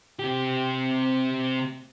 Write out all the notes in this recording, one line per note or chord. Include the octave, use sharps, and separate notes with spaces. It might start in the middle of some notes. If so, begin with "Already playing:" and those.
C3 G4